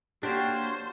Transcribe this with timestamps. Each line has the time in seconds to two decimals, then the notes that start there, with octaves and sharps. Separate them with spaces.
0.23 A#3 D4 F#4 G4 C5 C#5